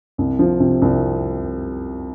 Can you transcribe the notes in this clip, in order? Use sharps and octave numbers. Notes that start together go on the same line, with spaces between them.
C2
F3
C3
C2